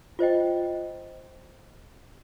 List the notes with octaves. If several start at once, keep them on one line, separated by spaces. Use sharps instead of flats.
F4 C5 D#5 G5